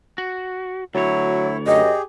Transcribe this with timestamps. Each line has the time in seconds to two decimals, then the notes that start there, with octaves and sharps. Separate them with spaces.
0.18 F#4
0.95 D2 F#3 E4 C#5
1.67 F#2 G4 G#4 D#5